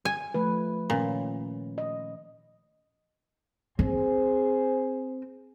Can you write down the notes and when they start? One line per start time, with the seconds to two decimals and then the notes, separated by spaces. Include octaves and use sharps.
0.05 G#5
0.34 F3 A3 B4
0.90 A#2 D#3 C#4
1.78 D#5
3.79 C4 G#4 C5